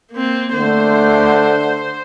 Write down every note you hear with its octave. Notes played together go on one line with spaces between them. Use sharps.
A#3 C4
D3 A3 C5